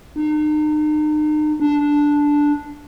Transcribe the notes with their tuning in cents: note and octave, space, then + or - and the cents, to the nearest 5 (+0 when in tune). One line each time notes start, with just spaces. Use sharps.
D#4 -40
D4 -5